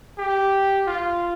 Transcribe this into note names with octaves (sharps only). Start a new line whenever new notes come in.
G4
F4